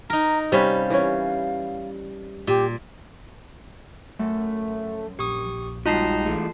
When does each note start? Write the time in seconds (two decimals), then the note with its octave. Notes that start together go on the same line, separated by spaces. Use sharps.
0.10 D#4 A#4 A#5
0.52 C3 G3 C#4 B4 F5 B5
0.90 E3 C#4
2.47 A#2 G4
4.19 F#2 A3
5.19 A#1 G4 C#6 D#6
5.86 G3 G#3 D#4 F4 F#4 A5 C7
6.25 E3 G#3 A3